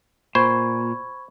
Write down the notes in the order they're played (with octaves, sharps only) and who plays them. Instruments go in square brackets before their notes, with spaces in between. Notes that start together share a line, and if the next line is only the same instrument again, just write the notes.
[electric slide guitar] A#2 [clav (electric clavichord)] C5 [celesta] B5 C#6 G#6